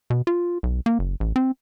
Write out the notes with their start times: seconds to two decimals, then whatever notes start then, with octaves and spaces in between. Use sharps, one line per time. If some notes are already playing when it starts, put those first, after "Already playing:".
0.10 B2
0.27 F4
0.63 B1
0.86 A#3
0.99 F#1
1.20 A1
1.36 C4